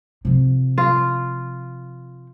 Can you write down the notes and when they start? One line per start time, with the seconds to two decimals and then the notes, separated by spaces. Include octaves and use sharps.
0.25 C3 F3
0.78 F4